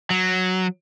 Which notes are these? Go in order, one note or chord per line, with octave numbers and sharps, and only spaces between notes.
F#3